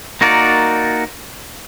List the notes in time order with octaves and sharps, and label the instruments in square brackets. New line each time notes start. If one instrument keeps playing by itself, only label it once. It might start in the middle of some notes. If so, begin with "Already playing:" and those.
[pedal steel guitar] A#3 D#4 F#4 A#4 D5